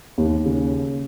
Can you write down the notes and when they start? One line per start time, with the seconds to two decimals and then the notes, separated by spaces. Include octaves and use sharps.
0.18 D#2
0.46 C#3